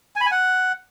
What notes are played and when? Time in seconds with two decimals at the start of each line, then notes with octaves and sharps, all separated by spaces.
0.16 G#5
0.21 B5
0.26 G#5
0.31 F#5